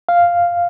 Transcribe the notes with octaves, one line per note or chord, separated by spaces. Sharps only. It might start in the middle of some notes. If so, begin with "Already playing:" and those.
F5